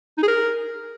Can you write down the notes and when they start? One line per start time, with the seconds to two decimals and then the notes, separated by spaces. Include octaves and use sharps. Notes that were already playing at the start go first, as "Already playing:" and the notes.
0.18 D#4
0.23 G#4
0.28 A#4